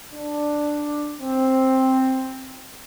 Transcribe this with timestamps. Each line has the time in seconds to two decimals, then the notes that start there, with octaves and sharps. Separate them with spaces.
0.13 D4
1.20 C4